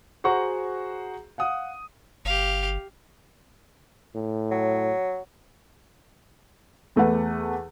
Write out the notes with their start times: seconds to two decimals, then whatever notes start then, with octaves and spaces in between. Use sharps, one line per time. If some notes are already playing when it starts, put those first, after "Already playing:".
0.24 F#4 G#4 C5 F#5 A#5 C#6
1.38 F5 F#5 D#6
2.25 G1 G4 F5
4.15 A2
4.51 F#3
6.96 E2 A3 B4 F#5